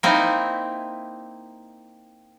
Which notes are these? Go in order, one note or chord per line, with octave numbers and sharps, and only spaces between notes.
A#3 C4 D#4 E4